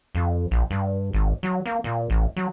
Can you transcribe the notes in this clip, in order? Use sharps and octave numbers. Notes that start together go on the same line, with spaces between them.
F2
A#1
G2
G#1
F#3
A#3
A#2
A1
F#3